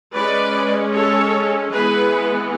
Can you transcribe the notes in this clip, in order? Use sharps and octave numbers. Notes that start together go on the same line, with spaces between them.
G#3 C#4 B4 D5
A4 C#5
E3 G#3 B3 G#4 B4